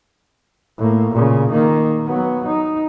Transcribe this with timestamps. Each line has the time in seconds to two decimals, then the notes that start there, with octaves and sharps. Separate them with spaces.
0.78 A2 A#3
1.12 A#2 C#3
1.50 D#3 A#3
2.06 F#3 B3
2.47 D#4